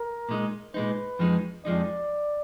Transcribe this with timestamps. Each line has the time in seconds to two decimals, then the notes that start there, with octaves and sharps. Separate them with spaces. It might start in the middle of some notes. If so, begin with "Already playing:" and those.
Already playing: A#4
0.29 A#2 G#3 D#4
0.74 A#2 G#3 D#4 B4
1.19 F2 F3 G#3 D#4
1.65 F2 F3 G#3 D#4 D5